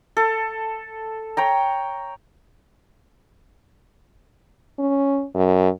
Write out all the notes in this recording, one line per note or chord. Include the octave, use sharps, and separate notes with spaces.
A4
C#5 G5 A#5
C#4
F#2